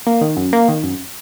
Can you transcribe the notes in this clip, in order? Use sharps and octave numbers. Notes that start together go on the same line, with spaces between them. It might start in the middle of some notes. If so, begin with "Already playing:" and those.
A#3
D#3
F#2
A#3
D#3
F#2